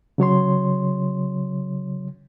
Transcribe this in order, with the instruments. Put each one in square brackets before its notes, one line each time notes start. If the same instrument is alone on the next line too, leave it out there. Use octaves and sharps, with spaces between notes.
[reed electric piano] C#3 F#3 C#5 C6